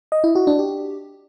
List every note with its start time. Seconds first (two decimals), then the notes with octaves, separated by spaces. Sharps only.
0.12 D#5
0.24 E4
0.35 F#4
0.47 D4
0.59 G4